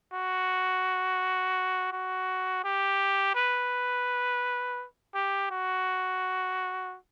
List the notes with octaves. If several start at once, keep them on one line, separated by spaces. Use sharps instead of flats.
F#4
F#4
G4
B4
G4
F#4